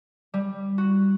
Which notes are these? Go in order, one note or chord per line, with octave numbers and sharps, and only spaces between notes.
G3
F#4